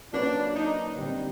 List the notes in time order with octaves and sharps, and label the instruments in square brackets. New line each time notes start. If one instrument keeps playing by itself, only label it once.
[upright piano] F#3 A#3 C#4 F#4 B4 [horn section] D4
[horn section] D#4
[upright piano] D3 G3 C4